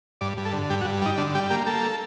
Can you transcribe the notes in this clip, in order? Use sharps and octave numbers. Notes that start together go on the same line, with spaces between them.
G2 D5
G2
A4
D3
G2 G4
F#4
G2
G3 D#4
D3 D4
G3 G4
A#3 G4
A#3 A4